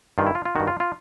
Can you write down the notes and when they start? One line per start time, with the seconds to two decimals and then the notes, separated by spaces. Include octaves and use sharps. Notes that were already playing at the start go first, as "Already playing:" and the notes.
0.18 G2 D#3 F4
0.26 E4
0.35 F4
0.45 F4
0.56 G2 D#3 F#4
0.67 F4
0.80 F4